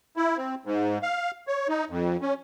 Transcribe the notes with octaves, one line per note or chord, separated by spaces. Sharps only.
E4
C4
G#2
F5
C#5
D#4
F2
C#4